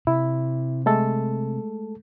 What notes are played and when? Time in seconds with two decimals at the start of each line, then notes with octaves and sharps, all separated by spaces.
0.07 C3 E4
0.86 G#3 A3 A4